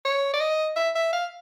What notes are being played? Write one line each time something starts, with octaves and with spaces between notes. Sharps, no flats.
C#5
D5
D#5
E5
E5
F5